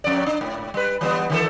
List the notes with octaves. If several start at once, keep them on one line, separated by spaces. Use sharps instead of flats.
F2 D5
D4
G#2
G3 B4
E3 G3 B3
D#3 E3 A4